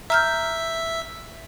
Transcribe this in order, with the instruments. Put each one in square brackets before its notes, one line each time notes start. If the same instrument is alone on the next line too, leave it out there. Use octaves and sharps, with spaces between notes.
[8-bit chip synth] E5 [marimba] A#5 F6 G6